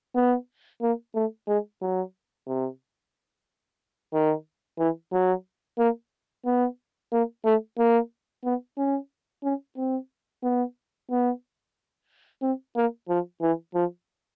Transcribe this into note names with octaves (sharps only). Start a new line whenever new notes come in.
B3
A#3
A3
G#3
F#3
C3
D#3
E3
F#3
A#3
B3
A#3
A3
A#3
B3
C#4
C#4
C4
B3
B3
C4
A#3
F3
E3
F3